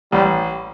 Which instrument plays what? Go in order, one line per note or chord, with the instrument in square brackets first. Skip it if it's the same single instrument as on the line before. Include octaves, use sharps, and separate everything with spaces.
[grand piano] A1 [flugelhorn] G3